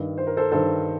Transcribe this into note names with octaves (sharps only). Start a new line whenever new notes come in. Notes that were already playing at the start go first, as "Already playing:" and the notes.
Already playing: G2 D#3
C5
A#4
A4 C5
G2 D#3 A4 C5